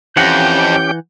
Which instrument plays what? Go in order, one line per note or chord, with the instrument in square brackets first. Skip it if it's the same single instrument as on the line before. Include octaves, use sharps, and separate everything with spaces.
[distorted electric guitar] F2 [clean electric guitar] E3 F#5 [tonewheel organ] C#4 G4 G5 [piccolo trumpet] G6